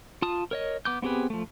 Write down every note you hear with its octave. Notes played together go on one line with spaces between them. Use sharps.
F4 A5 D#6
A#4 C#5 D#5
B3 D6 G6
B3 C4 G4 G#4 B4
F3 A3